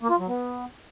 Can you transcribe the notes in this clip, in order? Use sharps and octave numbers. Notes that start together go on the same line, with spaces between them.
A#3
F4
F#3
B3